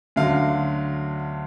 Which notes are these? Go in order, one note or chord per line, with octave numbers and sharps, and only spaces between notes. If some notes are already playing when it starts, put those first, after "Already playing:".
D2 D3 F#3 F5